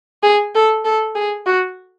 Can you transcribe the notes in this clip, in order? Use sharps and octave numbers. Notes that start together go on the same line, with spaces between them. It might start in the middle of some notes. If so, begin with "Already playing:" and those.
G#4
A4
A4
G#4
F#4